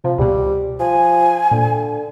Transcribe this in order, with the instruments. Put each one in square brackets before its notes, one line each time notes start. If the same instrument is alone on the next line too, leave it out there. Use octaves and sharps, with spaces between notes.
[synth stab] C3 [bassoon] F3
[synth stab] C#2 B2 [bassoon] G3
[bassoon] F3 [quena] G#5
[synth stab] A#2 [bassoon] D3